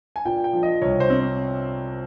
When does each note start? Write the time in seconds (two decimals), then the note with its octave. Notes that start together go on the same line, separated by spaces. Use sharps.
0.16 G#5
0.25 A#2 G5
0.44 G5
0.53 F3
0.63 D#5
0.82 C2 C#5
1.00 C5
1.10 C4
1.20 C#5